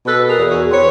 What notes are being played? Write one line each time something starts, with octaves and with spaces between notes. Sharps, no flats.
B2 A4 B4
G#4 A#4
E2
F#4 G#4
C4 B4 C#5